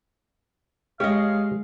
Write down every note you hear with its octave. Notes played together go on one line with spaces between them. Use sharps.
G#3 G4 C#5 D#5 F5